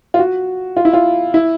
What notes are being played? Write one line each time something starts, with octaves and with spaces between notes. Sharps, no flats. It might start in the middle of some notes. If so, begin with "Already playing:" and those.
F4
F#4
F4
E4
F4
E4